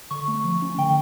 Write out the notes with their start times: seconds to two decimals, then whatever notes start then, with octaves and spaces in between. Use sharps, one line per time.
0.11 D3 C#6
0.28 A3
0.44 F3
0.62 C#4
0.78 D3 G5